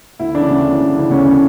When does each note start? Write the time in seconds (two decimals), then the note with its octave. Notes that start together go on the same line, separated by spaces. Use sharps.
0.20 D2 E4
0.35 C#3 E3 D4
0.50 D2
0.65 C#3 E3
0.81 D2
0.96 C#3 E3
1.11 D2 C#4
1.27 C#3 E3